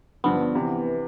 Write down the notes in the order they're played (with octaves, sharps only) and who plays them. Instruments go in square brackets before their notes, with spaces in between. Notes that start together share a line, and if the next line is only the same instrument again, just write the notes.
[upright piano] G2 D3 F3 [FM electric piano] B3
[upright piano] C3 E3